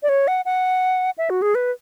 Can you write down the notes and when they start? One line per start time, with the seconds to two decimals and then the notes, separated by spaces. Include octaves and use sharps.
0.03 D5
0.09 C#5
0.28 F#5
0.45 F#5
1.18 E5
1.30 F#4
1.42 G#4
1.55 B4